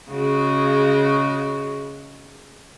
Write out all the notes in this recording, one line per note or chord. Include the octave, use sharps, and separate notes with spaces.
C#3 G#3 F#4